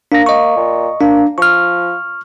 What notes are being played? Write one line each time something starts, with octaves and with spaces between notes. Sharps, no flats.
A#3 D4 A#6
D#5 C#6
A#2
A#3 D4
F3 C#6 F6